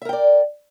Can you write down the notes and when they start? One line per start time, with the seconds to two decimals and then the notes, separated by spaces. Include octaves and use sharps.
0.02 E5
0.05 A#4
0.09 G5
0.13 D5